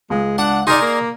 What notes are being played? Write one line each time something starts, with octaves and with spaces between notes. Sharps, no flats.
C#2 G#3
D4 F#5
D#4 G#4 A#4 D5 C6
A#3